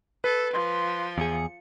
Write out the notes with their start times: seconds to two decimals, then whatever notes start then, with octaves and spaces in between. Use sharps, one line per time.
0.24 A4 B4
0.53 F3 C6
1.18 E2 G#4 C#7